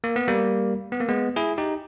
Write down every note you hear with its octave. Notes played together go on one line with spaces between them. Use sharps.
A#3
B3
G3 A#3
B3
A#3
G#3 B3
E4 G#4
D#4 G4